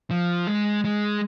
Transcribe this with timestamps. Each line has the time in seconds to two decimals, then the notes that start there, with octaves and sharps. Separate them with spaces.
0.11 F3
0.47 G#3
0.85 G#3